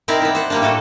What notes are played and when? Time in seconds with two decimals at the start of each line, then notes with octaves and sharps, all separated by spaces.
0.08 C4 D#4 E4 A#4 D5
0.22 B3 E4
0.35 C5 F#5
0.50 G3 A#3 D4
0.62 A2 A3 F#4 A4